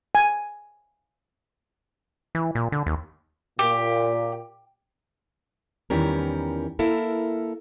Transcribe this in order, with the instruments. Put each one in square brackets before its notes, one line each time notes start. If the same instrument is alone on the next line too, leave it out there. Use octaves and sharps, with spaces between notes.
[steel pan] G#5
[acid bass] E3
A#2
D3
D#2
[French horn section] A#2 [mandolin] G4
[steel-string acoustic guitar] E2 D#3 E3 G3 C#4 A#4
A#3 E4 A4 A#4